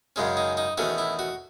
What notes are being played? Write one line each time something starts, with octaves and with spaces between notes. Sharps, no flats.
F#2 C#3 G#3 C#4
D#4
D#4
E2 D#3 A3 C#4 F#4
E4
F#4